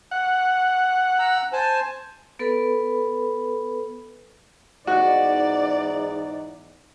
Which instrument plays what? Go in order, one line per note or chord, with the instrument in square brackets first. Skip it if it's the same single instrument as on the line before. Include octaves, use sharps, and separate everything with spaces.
[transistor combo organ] F#5
[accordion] A#5 E6
C5 G#5 A5
[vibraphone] B3 A4 B4 B5
[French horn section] E2 G#2 D#4 [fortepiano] F#4 F#5 [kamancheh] D5